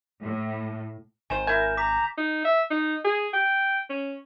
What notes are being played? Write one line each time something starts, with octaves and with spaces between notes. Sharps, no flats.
A2
G#1 D#3 C5 G#5 E7
E4 A#4 G#5 G6
A#5 D6 B6
D#4
E5
D#4
G#4
G5
C#4